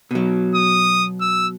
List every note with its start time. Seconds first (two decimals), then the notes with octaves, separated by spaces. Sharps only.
0.11 B2 F#3
0.55 D#6
1.21 E6